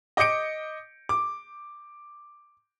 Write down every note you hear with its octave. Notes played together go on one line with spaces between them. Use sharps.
D#5 D6 D#6 G6 C#7 D7
D6